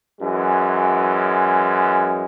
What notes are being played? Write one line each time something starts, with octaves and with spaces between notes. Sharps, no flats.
F#2 E3 G#3